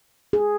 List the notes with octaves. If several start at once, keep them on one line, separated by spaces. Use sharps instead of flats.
G#4